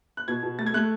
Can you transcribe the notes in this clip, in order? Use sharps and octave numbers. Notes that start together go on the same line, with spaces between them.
F#6
B2 G#6
B2
A3 A6
G#6
A3 F#6